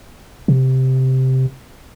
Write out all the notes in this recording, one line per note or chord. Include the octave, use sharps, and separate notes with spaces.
C3